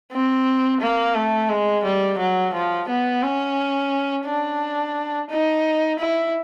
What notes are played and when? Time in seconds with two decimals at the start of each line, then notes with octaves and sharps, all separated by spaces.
0.12 C4
0.81 A#3
1.15 A3
1.49 G#3
1.84 G3
2.19 F#3
2.54 F3
2.89 B3
3.22 C#4
4.26 D4
5.30 D#4
5.99 E4